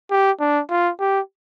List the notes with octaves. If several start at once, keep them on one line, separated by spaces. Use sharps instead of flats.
G4
D4
F4
G4